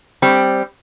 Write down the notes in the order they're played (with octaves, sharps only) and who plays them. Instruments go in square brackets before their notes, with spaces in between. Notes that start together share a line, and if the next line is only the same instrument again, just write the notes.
[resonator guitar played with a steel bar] G3 C4